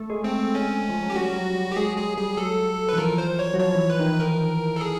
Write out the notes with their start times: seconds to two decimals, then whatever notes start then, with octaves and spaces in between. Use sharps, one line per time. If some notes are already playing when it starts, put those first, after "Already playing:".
Already playing: A3
0.10 G#3
0.24 A3 C4
0.39 A3
0.55 C#4
0.89 F3
1.03 F#3
1.10 G4
1.16 G3 F#4
1.36 F#3
1.56 G3
1.72 G4
1.77 G#3 G#4
1.97 G#3 G#4
2.17 G3 G#4
2.37 F#3 A4
2.89 E3 B4
2.98 F3 A#4
3.18 C5
3.39 C#5
3.54 F#3
3.59 F3 C#5
3.75 E3
3.90 B4
4.00 D#3
4.04 E3
4.20 D#3 A#4
4.76 A4
4.81 G#4